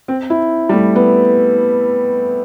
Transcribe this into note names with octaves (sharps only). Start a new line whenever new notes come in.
C4
E4
G3
A3
B3